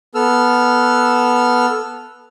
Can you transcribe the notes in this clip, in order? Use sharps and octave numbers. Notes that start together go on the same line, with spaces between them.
B3 A4 E6 F6